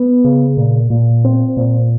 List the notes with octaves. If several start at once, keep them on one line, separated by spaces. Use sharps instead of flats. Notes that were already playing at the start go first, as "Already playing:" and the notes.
Already playing: B3
C#3
A#2
A#2
C4
A#2